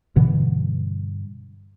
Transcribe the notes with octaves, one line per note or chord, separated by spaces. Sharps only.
G2 B2 D3 E3